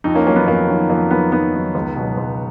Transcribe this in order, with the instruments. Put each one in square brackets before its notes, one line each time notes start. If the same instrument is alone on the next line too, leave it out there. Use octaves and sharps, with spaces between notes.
[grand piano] F2 D#4
A#3 C#4
D#3 F#3 A#3 C#4
B3
F2 A#3
D#3 F#3
F2 A#3
D#3 F#3 B3
F2 B3 D#4
D#3 F#3
C#2
B2 F#3
C#2